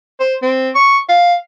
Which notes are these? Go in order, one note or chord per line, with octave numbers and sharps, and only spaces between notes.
C5
C4
C#6
F5